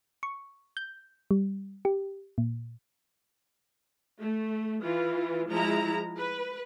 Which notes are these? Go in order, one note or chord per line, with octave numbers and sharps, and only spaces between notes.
C#6
G6
G3
G4
A#2
A3
E3 F4
F3 G#3 E4 A#5
B4